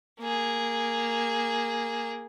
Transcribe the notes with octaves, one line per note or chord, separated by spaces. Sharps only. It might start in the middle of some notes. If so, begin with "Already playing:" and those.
A#3 G#4